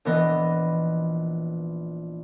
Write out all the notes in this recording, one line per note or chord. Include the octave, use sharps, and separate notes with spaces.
A#1 E3 B3 D#5